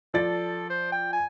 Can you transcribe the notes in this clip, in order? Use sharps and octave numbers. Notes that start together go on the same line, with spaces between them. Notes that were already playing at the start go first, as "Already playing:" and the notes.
F3 A4 D5 A6
C5
G5
G#5